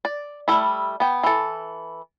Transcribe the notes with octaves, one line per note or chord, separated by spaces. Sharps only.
D5
G3 A3 E4
B3 G5
E3 A4